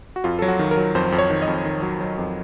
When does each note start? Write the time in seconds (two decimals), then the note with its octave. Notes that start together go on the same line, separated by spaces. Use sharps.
0.16 F#4
0.24 F2 F4
0.39 F#3 A4
0.48 F#4
0.59 D#3
0.71 A#4
0.77 F#3
0.95 F2 C5
1.12 F2
1.18 C#5
1.30 D#3
1.42 D#5
1.47 F2
1.65 D#3
1.82 F#3
2.00 F#3
2.18 F2